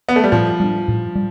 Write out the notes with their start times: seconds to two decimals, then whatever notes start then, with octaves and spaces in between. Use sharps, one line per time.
0.09 B3
0.16 A3
0.24 G3
0.32 A2 F3
0.60 G3 D4
0.88 A2
1.15 G3